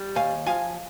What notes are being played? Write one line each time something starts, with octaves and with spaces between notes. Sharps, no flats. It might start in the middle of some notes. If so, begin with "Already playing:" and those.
Already playing: G3
D#2 F5 G#5
F3 F5 G#5